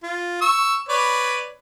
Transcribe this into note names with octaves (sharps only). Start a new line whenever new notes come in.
F4
C#6 E6
B4 C#5 D5